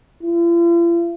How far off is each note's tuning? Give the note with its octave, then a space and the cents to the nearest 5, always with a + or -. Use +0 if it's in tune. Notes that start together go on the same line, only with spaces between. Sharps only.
F4 -45